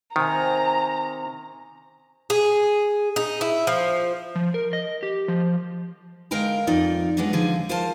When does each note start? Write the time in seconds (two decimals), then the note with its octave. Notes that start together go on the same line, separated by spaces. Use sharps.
0.16 C3 D#3 G#5 A#5
2.30 G#4
3.16 D#4
3.41 E4
3.67 F3
4.35 F3
4.54 A#4
4.73 D#5
5.03 G4
5.28 F3
6.31 D3 G#3 A#4 F5 G5 A#5
6.67 F2 D#4 F4 D5
7.17 F#3 G#3 B3 D4 D#4
7.33 D3 F3 G#4
7.69 F4 A#4 C5 F5 A5